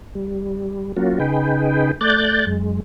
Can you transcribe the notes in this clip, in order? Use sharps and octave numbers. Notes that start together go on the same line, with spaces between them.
G3
F#3 A#3 C#4 F4 F#4
C#3 D#4 G#4 B4 G5
A3 D5 F#6 G6 A6
F#2 G#3